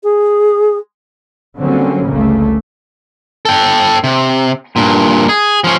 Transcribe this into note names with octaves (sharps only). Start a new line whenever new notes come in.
G#4
D3 F#3 G3 A#3 C4 C#4
G1 C#2 C#3 A3 A#3
A4 G5
C3
G2 A#2
G#4
F3 C#4